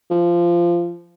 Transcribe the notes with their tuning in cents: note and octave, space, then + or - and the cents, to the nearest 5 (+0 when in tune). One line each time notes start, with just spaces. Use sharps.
F3 -15